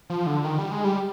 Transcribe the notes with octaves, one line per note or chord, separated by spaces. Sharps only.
F3
D3
D#3
G3
G#3
G3